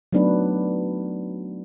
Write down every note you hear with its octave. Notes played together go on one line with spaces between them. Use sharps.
F#3 A3 B3 D4 D#4 B4